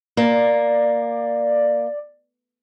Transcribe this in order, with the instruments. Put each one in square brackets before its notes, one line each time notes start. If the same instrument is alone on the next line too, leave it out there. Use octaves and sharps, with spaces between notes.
[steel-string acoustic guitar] A#3 [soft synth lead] D5